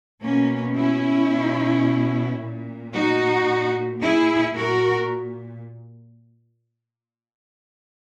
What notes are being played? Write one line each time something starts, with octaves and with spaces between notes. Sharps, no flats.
B2 A#3 C#4
C#4 E4
B2
A#2
D#4 F#4
A#2
E4 G#4
A#2 F#4 A#4